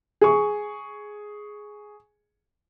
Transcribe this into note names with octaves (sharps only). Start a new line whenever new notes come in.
G#4 C#6